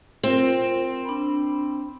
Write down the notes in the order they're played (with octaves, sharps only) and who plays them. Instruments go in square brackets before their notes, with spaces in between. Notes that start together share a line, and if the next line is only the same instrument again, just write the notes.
[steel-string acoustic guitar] C4 [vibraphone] F4 A#4
[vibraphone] D4 B5